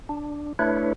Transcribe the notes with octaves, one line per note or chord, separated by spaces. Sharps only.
D4
A3 D4 E4 B4 C#5